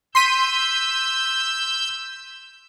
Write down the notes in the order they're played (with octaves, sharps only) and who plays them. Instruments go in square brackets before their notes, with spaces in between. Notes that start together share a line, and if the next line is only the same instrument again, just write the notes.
[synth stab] C6 B6 D#7 [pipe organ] E6 G6